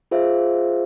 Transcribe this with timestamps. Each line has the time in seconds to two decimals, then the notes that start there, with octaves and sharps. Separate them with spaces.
0.11 F4 G#4 C5 E5 F5